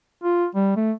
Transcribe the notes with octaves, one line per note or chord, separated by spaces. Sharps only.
F4
G3
A3